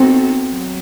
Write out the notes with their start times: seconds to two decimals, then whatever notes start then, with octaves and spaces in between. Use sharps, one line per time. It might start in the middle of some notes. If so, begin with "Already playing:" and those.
Already playing: B3 C4 D#4 F#4 A4
0.51 F#3